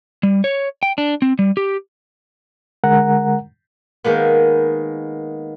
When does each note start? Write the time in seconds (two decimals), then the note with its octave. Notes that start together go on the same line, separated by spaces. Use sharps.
0.23 G3
0.44 C#5
0.83 G5
0.98 D4
1.22 C4
1.39 G3
1.57 G4
2.84 D3 G#3 A#4 F#5 A#5
4.04 D#3 G#3 A#3 B3